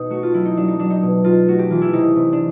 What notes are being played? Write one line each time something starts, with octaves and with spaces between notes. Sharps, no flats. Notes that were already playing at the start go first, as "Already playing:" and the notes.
Already playing: B2 D#4
A3 F#4
F4
F#3 E4
D#4
F#3 D4
D#4
F#3 D4
D#4
B2
B2 F4
A3 F#4
G4
E3 F4
E4
C3 D#4
C3
D4